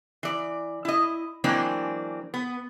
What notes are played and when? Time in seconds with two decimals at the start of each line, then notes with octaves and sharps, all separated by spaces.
0.23 E3 D5
0.85 E4 D#5
1.44 E3 F#3 G#3 A#3 C4 D4
2.34 B3